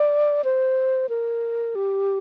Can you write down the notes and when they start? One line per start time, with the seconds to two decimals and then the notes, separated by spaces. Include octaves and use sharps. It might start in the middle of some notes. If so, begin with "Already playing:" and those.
Already playing: D5
0.44 C5
1.09 A#4
1.75 G4